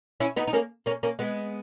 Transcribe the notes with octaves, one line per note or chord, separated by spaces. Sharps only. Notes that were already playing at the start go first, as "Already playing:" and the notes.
C#4 E4
B3 D#4
D#4
A#3 C#4
A#3 C#4
A#3 C#4
G#3 B3